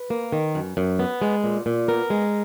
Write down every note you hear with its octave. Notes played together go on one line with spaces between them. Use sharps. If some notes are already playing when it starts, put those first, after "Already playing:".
Already playing: B4
A#3
D#3
F#2
F#2
B3
G#3
A#2
A#2
B3 A#4
G#3